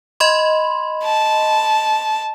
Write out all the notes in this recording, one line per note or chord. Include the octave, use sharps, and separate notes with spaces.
D#5 B5 C6
A5